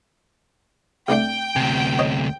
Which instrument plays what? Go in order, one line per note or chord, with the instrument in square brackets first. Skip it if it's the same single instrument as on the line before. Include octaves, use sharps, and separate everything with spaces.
[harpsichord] C2 A3 D4 [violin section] G5
[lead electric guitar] D2 C3 [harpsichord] G#5
[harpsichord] C#5 D#5